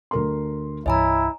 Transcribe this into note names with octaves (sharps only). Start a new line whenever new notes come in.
D2 A#4 C6
C2 G2 E3 E4 C#5 D#5 G#5 A#5